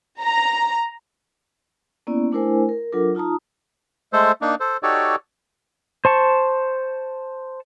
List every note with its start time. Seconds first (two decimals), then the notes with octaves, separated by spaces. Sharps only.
0.22 A#5
2.07 A#3 B3 C#4 E4 D5
2.32 A3 D4 E4 A#4 C5 G#5
2.69 A#4
2.92 F#3 D4 F4 A4 A#4 D6
3.15 D#4 F4 A5 A#5 D#6
4.13 G#3 A3 A4 C5
4.42 A#3 D4 D#4
4.60 A4 C5
4.83 D#4 F#4 G4 A4 C#5 D5
6.05 C5 A5 C#6